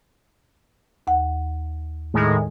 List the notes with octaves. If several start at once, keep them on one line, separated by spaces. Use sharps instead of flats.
D#2 F#5
A2 D#3 G#3